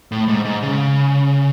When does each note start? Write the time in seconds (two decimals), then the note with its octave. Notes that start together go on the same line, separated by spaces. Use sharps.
0.12 A2
0.28 G#2
0.45 G#2
0.62 C#3